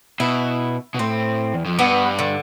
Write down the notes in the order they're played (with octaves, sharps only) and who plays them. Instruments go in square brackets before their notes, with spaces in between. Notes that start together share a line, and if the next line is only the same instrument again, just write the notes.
[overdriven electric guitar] B2 [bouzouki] E4
[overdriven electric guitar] B2
[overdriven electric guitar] A2 [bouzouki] C4
[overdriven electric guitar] E2
F2
[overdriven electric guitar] G2 [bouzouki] B3
[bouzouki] D3